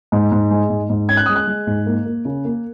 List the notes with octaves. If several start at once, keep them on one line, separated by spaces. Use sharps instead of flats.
G#2
G#2
G#3
G#2
G#2
C#4 G#6
F#6
G#3 D#6
F#6
G#3
G#2
A#3
A#3
C#3
A#3